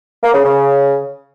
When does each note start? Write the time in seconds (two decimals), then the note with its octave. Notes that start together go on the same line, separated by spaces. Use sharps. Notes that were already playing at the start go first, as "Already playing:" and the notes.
0.24 A#3
0.34 C#3
0.44 C#3